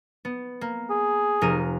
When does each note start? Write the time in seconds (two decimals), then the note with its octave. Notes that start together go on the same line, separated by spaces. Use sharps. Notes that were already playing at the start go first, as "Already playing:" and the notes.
0.25 B3
0.61 A#3
0.90 G#4
1.41 F1 A#4 D#7